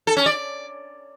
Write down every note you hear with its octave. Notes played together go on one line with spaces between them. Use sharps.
A4
C#4
D5